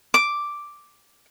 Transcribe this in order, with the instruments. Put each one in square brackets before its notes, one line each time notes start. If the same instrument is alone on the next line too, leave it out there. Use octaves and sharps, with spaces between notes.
[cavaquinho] D6